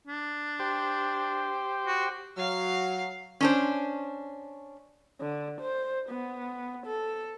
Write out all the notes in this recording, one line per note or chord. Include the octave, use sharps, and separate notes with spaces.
D4
G4 C5
F#4
F#3 F5
C#4 D4 C5
D3
C5
B3
A4